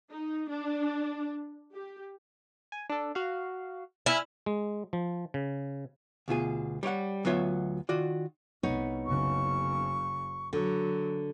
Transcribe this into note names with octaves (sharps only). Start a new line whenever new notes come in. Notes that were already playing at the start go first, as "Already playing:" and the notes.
D#4
D4
G4
G#5
D4 A4
F#4 F5
E4 E5 G#5 F6
G#3
F3
C#3
D2 B2 F4 G#4
G3 C#5 D5 F#5
D2 F#3 B3 F4 C#5 E5
D#3 F4 F#4 D5
C2 B3 D#4 C#5
F#1 C#3 C#6
D3 F#3